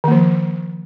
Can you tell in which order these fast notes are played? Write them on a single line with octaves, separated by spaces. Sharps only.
D#3 A#3 F3